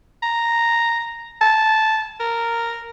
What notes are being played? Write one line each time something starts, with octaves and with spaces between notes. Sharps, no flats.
A#5
A5
A#4